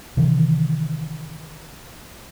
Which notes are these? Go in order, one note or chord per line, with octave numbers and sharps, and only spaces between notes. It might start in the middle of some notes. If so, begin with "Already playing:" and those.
C3 D#3 E3